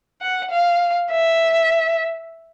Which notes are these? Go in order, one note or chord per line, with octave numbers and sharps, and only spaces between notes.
F#5
F5
E5